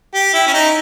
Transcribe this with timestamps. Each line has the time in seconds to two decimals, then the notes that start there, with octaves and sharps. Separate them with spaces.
0.14 G4
0.34 E4
0.47 C#4
0.53 D#4